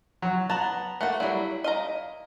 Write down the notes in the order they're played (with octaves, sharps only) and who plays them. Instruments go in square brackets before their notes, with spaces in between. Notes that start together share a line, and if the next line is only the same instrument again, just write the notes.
[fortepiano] F#3
[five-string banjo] B3 F#5 [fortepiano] A5 A#5
[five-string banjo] A3 A#3 [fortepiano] F#5
[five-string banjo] F#3 G3 [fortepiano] E4
[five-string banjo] D#5 F5 A#5